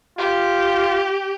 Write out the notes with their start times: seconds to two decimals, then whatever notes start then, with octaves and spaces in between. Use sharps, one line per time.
0.18 F4 G4